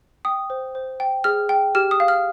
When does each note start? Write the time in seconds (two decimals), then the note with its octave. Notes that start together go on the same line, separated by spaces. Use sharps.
0.25 G5 D#6
0.50 C5
0.75 C5
1.00 G5
1.24 G#4 F6
1.49 G5
1.75 G4 F6
1.91 D#6
2.00 F5
2.08 F6